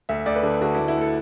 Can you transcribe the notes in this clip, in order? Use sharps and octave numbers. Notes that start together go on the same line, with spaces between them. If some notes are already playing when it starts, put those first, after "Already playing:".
D2 E5
D2 D5
B4
D3
D3 F#4
D2 E4
E4
D2 A4